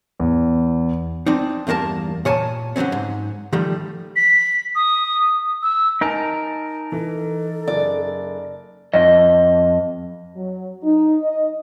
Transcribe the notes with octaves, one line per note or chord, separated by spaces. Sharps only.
E2
C4 D4 D#4
E2 G2 A#3 A#4 A5
A#2 C#5 G#5 A5
D3 F#3 G#3 C4 C#4
G#2
D#3 F3 G3 A3
B6
D#6
E6
D#4 A#4 G#5 A5
E3 A4
F#1 D5
F2 D#5
F#3
D#4
D#5